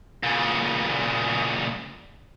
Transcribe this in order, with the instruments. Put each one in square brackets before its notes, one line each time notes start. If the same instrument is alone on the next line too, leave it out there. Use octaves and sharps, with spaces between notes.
[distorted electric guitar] A#2 C#3